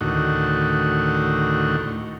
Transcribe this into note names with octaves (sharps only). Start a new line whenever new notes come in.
D2 A2 D#3 F#4